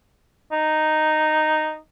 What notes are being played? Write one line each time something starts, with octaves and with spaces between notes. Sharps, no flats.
D#4